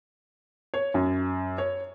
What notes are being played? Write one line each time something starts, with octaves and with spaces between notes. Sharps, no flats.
C#5
F#2
C#5